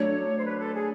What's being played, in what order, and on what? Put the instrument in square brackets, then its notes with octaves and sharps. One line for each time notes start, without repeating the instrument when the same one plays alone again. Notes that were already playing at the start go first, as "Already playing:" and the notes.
Already playing: [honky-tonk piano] F#3 A3 D4 [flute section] C#5
[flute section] C5
B4
A4
G#4